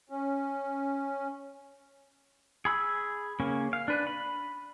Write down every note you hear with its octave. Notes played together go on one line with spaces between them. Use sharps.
C#4
G#4 B5 E6
C#3 A#3 C#4
F5
D4 B4
B5